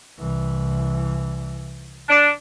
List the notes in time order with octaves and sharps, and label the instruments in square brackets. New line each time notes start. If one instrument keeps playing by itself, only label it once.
[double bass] C2 E3
[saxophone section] D4